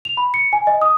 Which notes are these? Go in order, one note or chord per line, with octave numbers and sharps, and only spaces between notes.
F7
B5
C#7
G#5
D#5
D#6